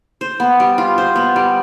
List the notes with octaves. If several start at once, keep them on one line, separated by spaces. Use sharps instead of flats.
C5
B3
G3
F4
C5
B3
G3